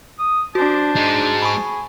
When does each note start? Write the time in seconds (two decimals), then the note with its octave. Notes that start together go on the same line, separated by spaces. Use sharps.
0.19 D#6
0.55 D4 F#4 C5 A5
0.96 G#3 D#4
1.42 G#4 B5 C#6